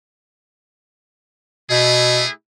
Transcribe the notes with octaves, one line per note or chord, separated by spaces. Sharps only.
B2 A3 E4 G#4